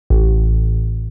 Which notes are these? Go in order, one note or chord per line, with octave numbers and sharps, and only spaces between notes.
A1